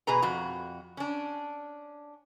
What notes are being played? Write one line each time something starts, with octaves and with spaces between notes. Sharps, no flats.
B2 G#4 B4 A#5
F2 F#4
C#4 D4